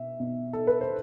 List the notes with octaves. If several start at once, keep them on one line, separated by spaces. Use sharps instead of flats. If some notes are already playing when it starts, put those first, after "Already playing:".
Already playing: B2 E5
B2
A4
B4
C5